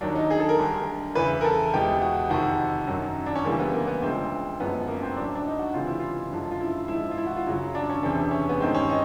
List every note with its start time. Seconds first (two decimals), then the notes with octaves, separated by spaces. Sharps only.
0.01 D#2 D#3 F#3 D4
0.15 D#4
0.30 G#4
0.40 A4
0.49 A#4
0.58 D2 D3 G3
1.15 E2 C#3 E3 B4
1.41 A#4
1.44 A4
1.74 E2 B2 G#3 G4
2.02 F#4
2.30 F2 C3 D#3 F#4
2.87 F#2 D#3 F#3
3.26 D4
3.35 C#4
3.44 C#2 C#3 E3 G3 A#3
3.59 B3
3.73 A#3
3.87 B3
4.02 D2 C#3 F3 G#3 C4
4.60 F#2 D3 F3 G#3 B3
4.88 A#3
5.03 C4
5.17 A2 F#3 D4
5.35 D4
5.45 D#4
5.59 F#4
5.73 C#2 C3 E3 F4
5.87 E4
5.99 F4
6.31 F#2 D3 F3 G#3
6.51 F4
6.61 E4
6.88 G#2 F3 G#3 E4
7.11 F4
7.18 E4
7.27 F#4
7.36 F4
7.46 F#2 C#3 F#3
7.75 D4
7.89 C#4
8.03 E2 C3 E3 D4
8.31 C#4
8.49 B3
8.60 G2 D#3 G#3 C4
8.75 C#4
8.89 D#4